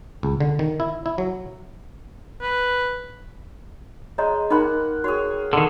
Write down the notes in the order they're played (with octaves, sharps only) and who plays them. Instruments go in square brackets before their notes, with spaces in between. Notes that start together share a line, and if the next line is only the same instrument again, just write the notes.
[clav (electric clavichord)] C#2
D3
D#3
E4
E4
F#3
[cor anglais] B4
[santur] G#3 [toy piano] C#5 D#5 A#5
[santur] A#3 F#5 [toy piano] D#4 B5 C6
[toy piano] F#4 [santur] G#4 C#5
[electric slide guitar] D3 D#3 [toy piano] A4